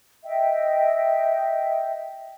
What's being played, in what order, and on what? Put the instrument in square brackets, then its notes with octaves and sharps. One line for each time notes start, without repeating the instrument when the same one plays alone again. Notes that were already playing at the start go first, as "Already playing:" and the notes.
[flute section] D#5 E5 G5